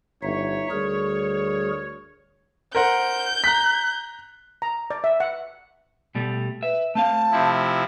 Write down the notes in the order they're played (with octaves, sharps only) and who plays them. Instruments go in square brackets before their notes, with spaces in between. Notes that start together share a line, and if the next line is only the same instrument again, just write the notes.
[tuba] G1 [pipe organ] D#4 E5 [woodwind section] C#5
[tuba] D2 [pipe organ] G3 G#4 A#4
[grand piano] A#4 C5 F#5 [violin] G6
[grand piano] A#5 F#6 B6
[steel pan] A#5
D5
E5
F#5
[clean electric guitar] B2 G3 A3
[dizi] B4 [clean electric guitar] E5
[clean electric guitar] A3 C4 F5 [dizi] A5
[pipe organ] C3 F3 E4